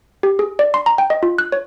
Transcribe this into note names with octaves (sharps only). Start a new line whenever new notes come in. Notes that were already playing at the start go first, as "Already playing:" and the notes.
G4
G#4
D5
C6
A#5
G5
D#5
F4
F#6
C#5